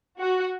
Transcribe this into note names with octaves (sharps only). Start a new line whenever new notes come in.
F#4